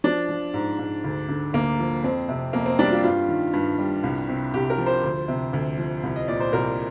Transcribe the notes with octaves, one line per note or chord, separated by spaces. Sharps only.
F3 D4
F3
G#2
G#2
D2
D3
D2 A#3
F3
F2 C4
C3
F2 A#3
C4
G3 D4
F4
G2 F4
D#3
G2
G3
C2
C3
C2 G4
A#4
F3
C5
D2
C3
D2
F3
C2
D#5
A#2 D5
C5
C2 A#4